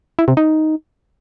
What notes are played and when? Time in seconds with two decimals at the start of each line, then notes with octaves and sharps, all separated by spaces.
0.19 E4
0.28 C3
0.37 D#4